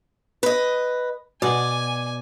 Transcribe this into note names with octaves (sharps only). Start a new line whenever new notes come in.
B4 D#5
B2 D5 F#5 G#5